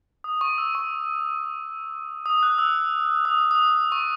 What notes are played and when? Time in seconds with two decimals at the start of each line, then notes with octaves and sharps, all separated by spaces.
0.24 D#6
0.41 C#6
0.58 E6
0.75 C#6
2.26 D#6
2.43 F#6
2.58 E6
3.25 D#6
3.51 D#6
3.92 C#6